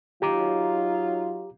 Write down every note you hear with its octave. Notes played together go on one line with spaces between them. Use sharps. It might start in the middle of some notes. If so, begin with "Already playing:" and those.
F#3 D#4 F4 G4 A#5 D6